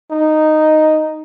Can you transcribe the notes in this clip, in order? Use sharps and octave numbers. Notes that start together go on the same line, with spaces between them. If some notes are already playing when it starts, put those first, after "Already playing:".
D#4